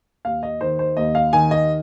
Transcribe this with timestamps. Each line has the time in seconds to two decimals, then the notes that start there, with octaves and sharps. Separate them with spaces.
0.25 D#2 F5
0.43 D#5
0.61 D#3 C5
0.79 C5
0.97 D#2 D#5
1.15 F5
1.33 D#3 G#5
1.51 D#5